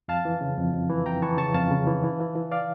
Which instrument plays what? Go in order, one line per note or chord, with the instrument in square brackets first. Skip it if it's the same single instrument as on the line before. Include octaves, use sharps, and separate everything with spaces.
[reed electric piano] F2 F5 A5
E3
C#3
F2
F2
E3
F2 G5 A#5
E3 A5 C#6
C#3 A5 C#6
F2 F5 A5
C#3
E3
E3
E3
E3
D5 F5